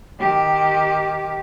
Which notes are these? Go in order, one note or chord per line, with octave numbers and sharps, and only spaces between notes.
D#3 G4